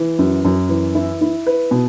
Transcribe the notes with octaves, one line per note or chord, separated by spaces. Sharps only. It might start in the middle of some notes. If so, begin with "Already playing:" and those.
Already playing: E3
F#2
F#2
E3
E4
E4
B4
B2